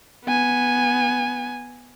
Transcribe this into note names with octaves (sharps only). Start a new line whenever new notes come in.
B3 G#5